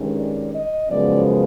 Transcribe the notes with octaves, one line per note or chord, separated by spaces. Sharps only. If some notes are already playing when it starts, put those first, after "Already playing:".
Already playing: G2 D#3 G#3 C#4
D5
D#5
F#2 C#3 F3 G#3 B3 D5